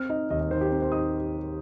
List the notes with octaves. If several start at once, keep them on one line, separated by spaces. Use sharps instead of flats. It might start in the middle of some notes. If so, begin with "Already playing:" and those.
Already playing: C4 F6
D#4 D#5
D#2 D#5
D#5
D#3 C5
G4
C4 A#4
C5
D#4 D#6